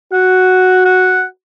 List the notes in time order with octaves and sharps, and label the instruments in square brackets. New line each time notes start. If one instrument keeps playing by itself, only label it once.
[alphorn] F#4 [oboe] F#5
[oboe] F#5